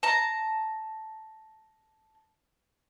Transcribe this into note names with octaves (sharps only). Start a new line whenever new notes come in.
A5 A#5